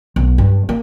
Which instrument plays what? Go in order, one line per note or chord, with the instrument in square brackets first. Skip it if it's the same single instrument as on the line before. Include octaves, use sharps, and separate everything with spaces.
[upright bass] B1
G2
A#3